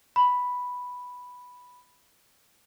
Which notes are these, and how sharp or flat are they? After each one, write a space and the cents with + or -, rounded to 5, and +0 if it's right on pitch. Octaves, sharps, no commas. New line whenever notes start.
B5 +0